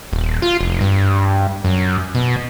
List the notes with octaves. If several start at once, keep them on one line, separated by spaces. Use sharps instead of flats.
D#1
F4
F1
G2
F#2
B2